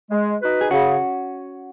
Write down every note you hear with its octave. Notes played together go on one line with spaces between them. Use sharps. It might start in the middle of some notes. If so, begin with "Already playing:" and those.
G#3
D#4 F#4 B4
G#4
C#3 C#4 F#4